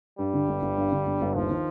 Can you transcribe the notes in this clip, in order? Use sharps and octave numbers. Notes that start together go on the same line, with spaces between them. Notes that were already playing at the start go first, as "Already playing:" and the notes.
G2 G3
D3
G1
G1
G2
D3
G1
G1
D#2 F3
D#3